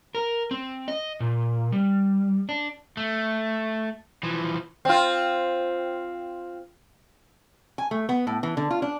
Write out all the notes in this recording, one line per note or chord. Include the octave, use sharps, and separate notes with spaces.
A#4
C4
D#5
A#2
G3
D4
A3
E3 F3
C4 F4
G#5
A3
B3
A2
E3
D3
F4
D4